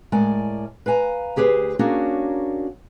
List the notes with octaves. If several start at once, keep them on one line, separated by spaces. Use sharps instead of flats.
A2 G#3 A#4 D5 G#5
B4 F5 G#5 A#5
D2 G4 G#4 B4 C5
A#3 C#4 D4 F#4 G#4 A#4